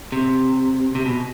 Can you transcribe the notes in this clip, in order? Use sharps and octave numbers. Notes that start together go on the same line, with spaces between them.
C3
C3
B2